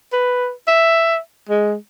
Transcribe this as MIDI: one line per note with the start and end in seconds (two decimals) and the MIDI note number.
0.13 0.51 71
0.68 1.19 76
1.49 1.75 56